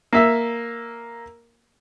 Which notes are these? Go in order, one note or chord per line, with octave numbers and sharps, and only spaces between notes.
A#3 E5 E6